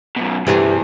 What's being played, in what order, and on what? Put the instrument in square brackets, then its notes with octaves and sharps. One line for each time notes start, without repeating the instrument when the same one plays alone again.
[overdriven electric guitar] F#2 B2
[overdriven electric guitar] E2 [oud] G2 G4 G#4 [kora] C3 E3 A3